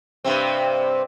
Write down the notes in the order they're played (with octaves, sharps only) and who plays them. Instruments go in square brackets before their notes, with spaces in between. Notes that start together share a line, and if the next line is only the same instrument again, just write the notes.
[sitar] G2 C3 C4